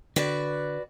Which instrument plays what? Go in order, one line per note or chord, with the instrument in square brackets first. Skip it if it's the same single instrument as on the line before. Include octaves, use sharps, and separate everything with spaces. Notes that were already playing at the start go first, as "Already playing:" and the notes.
[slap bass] D3 [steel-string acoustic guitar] F#4 B4 D5